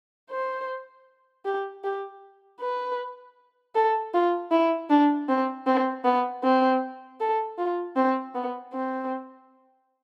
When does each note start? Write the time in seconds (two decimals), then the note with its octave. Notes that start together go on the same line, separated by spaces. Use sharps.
0.30 C5
1.45 G4
1.84 G4
2.60 B4
3.75 A4
4.14 F4
4.51 E4
4.90 D4
5.29 C4
5.66 C4
6.04 B3
6.43 C4
7.20 A4
7.58 F4
7.96 C4
8.35 B3
8.73 C4